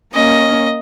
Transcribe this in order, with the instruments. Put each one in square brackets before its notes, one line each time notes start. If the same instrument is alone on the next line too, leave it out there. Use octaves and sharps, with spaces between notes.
[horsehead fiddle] A#3 C#4 [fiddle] D#5